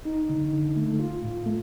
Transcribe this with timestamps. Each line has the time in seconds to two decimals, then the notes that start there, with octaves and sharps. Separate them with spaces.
0.05 D#4
0.29 D3
0.52 D3
0.77 A3
1.00 F4
1.23 A2
1.46 A3